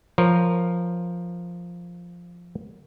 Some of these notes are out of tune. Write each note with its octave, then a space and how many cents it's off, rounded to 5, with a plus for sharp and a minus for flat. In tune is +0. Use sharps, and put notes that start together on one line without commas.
F3 +0 A#4 +0 C#5 +0